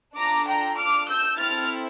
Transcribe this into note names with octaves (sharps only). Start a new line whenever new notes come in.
D4 F4 A4 A#5 D6
G5 A#5
D6 F6
E6 G6
C4 E4 A4 F6 A6